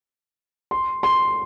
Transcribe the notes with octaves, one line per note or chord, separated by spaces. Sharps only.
C6
C6